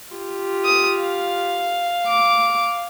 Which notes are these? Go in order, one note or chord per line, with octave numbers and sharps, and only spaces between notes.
F4 G4
D#6
F5
D6